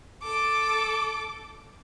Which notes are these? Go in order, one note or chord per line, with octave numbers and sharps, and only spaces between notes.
A4 D6